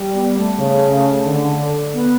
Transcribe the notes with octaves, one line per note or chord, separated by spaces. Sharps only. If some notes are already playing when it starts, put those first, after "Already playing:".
Already playing: G3
B3
A3
C#3
D3
B3